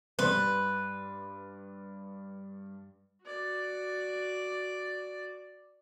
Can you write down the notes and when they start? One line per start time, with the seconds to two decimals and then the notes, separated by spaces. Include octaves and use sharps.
0.19 G2 B4 D5 C6
3.25 F#4 D5